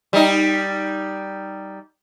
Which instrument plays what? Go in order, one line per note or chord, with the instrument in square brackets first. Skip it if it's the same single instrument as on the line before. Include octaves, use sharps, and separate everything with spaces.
[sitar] G3 D#4